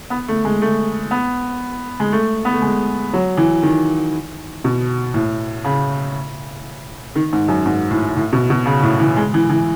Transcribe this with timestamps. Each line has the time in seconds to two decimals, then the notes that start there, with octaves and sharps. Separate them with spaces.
0.10 B3
0.28 A3
0.45 G#3
0.62 A3
1.11 B3
2.00 G#3
2.12 A3
2.45 B3
2.53 A3
2.62 G#3
3.13 F#3
3.37 E3
3.63 D#3
4.64 B2
5.14 A2
5.65 C#3
7.15 D#3
7.33 G#2
7.48 F#2
7.66 G#2
7.91 A2
8.16 A2
8.33 B2
8.50 B2
8.66 C#3
8.83 A2
9.00 E3
9.17 G#3
9.34 E3
9.50 E3